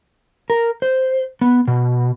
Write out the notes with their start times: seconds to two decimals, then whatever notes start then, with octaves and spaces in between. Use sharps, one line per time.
0.50 A#4
0.82 C5
1.41 B3
1.68 B2